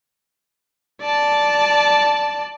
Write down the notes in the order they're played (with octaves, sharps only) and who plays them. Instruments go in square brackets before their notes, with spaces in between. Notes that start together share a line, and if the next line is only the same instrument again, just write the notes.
[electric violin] D5 A5